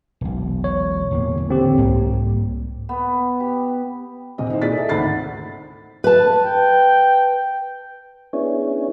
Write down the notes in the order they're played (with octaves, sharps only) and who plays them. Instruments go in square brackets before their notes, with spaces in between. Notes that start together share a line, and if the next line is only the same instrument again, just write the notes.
[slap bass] E1 B1
[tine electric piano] C#5
[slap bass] D1 E2 A#3
[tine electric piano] D3 C4 G4
[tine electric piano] C2 [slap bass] G#2 A#3 C4
[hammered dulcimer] B3
G4
[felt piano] D#1 C3 D#5
D#4 E4 C5
A#2 G#4 D5 D#5 A6 B6
A4 E5
G#1 D2 B5 A6 C7
[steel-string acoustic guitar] B4 A5
[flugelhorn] G5
[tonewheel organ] B3 C#4 D4 E4 G#4 C#5